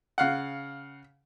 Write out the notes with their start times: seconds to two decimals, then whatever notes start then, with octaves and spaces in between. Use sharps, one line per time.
0.18 C#3 F5 F#5